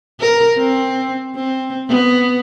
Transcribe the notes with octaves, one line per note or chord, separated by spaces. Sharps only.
A#4
C4
C4
B3